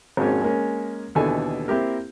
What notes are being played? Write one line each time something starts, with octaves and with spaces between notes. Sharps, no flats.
G#1 F2 G#2 G#3 A#3 C#4
G#3 A#3 C#4
D#2 B2 D3 E3 A4 G#5
A#3 C4 E4 G4 A#4